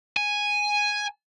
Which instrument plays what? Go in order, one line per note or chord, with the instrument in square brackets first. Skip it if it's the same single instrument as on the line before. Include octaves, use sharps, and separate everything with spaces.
[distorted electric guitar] G#5